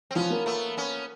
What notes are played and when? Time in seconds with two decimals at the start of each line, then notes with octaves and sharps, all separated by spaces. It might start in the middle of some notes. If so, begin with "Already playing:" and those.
0.11 C4
0.15 F3 B3 C#4
0.30 A#3
0.46 A3 B3
0.77 B3 C#4